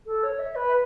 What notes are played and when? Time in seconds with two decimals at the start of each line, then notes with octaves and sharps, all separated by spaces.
0.06 A4
0.23 C#5
0.39 E5
0.55 B4